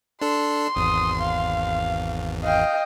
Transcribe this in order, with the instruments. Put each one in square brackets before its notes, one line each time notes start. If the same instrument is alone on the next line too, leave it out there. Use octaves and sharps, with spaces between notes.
[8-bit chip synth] D4 A4 [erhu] C6
[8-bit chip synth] G#1 E2 [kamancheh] D#6
[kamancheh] F5
[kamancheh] D#5 G5 [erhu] F5